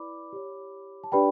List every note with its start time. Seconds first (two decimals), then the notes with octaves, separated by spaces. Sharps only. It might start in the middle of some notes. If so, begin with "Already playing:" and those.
Already playing: E4 B4 D5 B5 D6
0.33 G4 C#5
1.04 A5
1.12 D4 G4 B4 D5 G5 B5